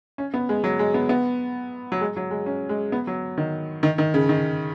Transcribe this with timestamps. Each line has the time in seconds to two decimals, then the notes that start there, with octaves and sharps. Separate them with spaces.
0.18 C#4
0.34 B3
0.49 G#3
0.64 F#3
0.79 G#3
0.94 B3
1.09 B3
1.92 F#3
2.01 G#3
2.16 F#3
2.31 G#3
2.46 C#4
2.69 G#3
2.92 B3
3.07 F#3
3.38 D#3
3.83 D#3
3.98 D#3
4.14 C#3
4.29 D#3